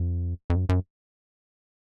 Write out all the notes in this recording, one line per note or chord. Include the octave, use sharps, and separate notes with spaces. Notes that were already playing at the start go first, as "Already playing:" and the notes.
Already playing: F2
F2
F#2
F#2